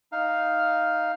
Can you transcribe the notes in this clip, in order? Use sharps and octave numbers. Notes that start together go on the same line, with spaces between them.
D#4 F5